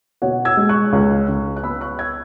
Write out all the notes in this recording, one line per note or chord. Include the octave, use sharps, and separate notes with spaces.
B2 C#5 F#5
E6 G#6
G#3
C#6 F#6
C#2
C#2
F#6
B3 B5 E6
C#6 F#6
E6 G#6